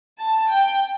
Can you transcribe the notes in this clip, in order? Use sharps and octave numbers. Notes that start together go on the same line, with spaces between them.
A5
G5